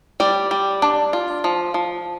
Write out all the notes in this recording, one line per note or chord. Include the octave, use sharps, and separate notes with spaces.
G3 D5
G3
D4
F4
F3
F3